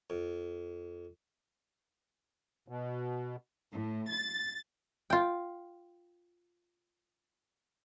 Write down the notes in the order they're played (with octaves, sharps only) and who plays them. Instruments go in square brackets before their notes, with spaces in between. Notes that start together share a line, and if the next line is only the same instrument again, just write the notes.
[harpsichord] F2
[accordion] B2
[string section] A2
A6
[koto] F4 G5